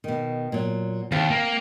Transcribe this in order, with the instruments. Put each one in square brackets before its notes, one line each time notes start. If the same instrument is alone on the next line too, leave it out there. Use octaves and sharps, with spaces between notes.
[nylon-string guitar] B2 D#3
A#2 F#3
[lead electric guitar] D#2 [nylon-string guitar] C4 F5
[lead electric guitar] A#3